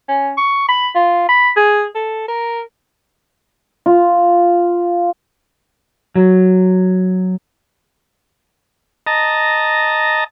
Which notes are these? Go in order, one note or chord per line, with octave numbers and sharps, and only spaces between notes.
C#4
C#6
B5
F4
B5
G#4
A4
A#4
F4
F#3
D#5 A5 A#5